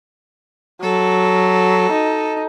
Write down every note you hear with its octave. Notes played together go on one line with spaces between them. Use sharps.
F#3 A4
D#4